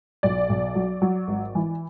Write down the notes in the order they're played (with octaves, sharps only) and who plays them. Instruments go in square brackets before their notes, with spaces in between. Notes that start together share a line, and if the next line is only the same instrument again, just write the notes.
[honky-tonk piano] B1 D5
B1
F#3
F#3
G#1
E3